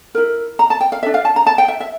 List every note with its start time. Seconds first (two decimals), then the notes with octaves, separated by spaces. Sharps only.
0.15 E4 A#4
0.59 A#5
0.70 A5
0.81 G5
0.92 F5
1.03 D4 A4 E5
1.14 F5
1.25 A5
1.36 A#5
1.46 A5
1.58 G5
1.68 E5
1.80 E5